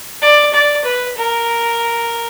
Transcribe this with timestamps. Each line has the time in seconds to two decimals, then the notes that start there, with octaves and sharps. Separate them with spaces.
0.22 D5
0.53 D5
0.84 B4
1.17 A#4